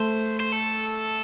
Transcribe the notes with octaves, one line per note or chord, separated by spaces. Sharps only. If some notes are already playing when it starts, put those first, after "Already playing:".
Already playing: A3 C5
C5
A4